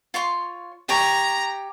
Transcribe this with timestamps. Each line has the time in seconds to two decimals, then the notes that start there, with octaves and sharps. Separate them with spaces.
0.14 F4 C#5 C6
0.89 G4 C#5 A#5